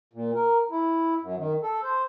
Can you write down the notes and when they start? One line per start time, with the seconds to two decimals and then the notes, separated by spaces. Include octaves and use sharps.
0.13 A#2
0.35 A#4
0.70 E4
1.22 F#2
1.37 D#3
1.63 A4
1.83 C5